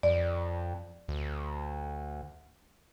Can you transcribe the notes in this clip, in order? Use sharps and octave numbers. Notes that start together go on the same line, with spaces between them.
F2 D5
D2